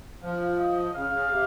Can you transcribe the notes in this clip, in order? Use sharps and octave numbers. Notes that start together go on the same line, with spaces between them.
F3 F5
D#5
C#3 F5
C#3
C3